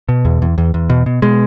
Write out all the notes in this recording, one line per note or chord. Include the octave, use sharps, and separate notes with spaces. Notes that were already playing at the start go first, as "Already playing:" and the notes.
B2
E2
E2
E2
E2
B2
B2
B2 G#3